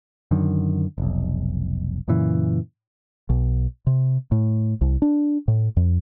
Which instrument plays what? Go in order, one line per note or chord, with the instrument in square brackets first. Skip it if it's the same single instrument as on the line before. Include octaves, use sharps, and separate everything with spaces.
[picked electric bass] F#2 D3 D#3
F1 B1
F#2 A#2 C#3 E3
[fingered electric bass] B1
C3
A2
C2
D4
A2
F2